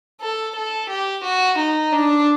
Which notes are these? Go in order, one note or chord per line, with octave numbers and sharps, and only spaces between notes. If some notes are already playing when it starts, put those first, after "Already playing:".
A4
A4
G4
F#4
D#4
D4